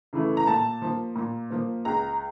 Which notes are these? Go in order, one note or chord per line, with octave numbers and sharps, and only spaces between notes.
C#3 E3 A3
A#5
A#2 A5
F3 A#3
A#2
F3 A#3
C#2 A#5